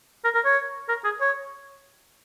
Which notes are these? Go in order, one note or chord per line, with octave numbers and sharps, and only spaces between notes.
A#4
A#4
C#5
A#4
G#4
C#5